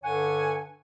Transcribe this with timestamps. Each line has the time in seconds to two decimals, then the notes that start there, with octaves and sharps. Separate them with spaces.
0.03 G2 D3 C#5 F#5 G#5